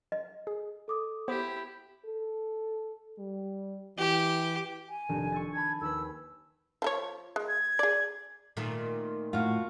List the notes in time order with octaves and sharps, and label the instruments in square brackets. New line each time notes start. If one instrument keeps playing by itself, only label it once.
[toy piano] D#5
[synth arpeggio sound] G#4
[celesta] A4 D6 D#6
[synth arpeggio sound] B3 C5 [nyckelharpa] E4 G4
[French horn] A4
G3
[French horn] E3 [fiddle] G4
[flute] G#5
[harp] F1 C3 [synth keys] D#3 D4
[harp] C#6 E6 A6
[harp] G#5 A5 B5 [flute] G#6
[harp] D#2 B4 [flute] E6
[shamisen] F3 A4 C#5
G#3
[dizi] G#6
[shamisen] G#4 D5
[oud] A#2 D#3 A3
[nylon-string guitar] A2 [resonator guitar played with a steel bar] F4 F#4